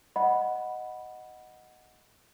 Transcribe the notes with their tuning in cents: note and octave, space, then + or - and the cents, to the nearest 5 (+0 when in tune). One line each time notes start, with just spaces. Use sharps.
D#5 +0 F#5 +0 B5 +0